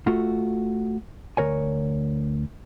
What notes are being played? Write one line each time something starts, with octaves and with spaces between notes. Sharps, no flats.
A3 F4 F#4
D2 A#4 C#5 G#5